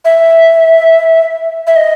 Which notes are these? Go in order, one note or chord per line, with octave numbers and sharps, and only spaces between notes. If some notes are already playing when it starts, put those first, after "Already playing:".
E5
E5
D#5